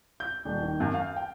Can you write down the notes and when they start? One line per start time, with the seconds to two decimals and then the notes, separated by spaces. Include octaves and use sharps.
0.20 G6
0.45 D#1
0.62 D#3
0.80 F#2
0.94 F5
1.16 G5